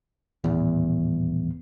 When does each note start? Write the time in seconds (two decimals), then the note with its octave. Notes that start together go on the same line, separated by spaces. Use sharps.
0.44 D#1 A1 E2